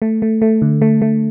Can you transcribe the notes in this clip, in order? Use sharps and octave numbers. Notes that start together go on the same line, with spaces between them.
A3
A3
A3
D3
A3
A3